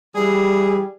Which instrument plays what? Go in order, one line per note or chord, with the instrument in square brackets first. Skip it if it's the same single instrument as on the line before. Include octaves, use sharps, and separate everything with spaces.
[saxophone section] E3 G#4 [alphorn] G3